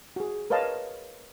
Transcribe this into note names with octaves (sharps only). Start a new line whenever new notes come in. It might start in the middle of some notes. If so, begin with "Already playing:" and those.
F#4 G#4
A#4 B4 C#5 D#5 F5 A5